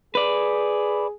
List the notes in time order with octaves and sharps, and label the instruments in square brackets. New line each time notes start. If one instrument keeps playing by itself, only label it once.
[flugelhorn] G#4 [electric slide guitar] B4 D5